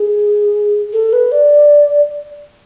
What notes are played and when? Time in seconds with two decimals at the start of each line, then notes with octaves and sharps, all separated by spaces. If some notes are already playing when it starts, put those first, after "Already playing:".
Already playing: G#4
0.93 A4
1.13 B4
1.32 D5